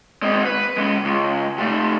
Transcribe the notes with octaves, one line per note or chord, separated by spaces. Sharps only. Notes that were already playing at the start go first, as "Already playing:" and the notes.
G#3 C4
B4
G#3 C#4
C#2
C3 A3